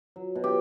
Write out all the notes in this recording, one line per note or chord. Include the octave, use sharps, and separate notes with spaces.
F#3
B2
G4